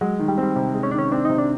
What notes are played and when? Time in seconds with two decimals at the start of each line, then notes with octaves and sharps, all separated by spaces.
0.01 F#3 G#3
0.19 D#3
0.28 G3
0.38 C4
0.43 G3
0.56 C3 G3
0.74 G#3
0.83 C#4
0.91 D#3 D4
0.98 C#4
1.12 C4 D4
1.25 C3 D#4
1.38 D4